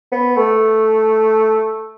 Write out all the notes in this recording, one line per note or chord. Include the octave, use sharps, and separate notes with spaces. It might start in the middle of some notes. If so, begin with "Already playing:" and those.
B3
A3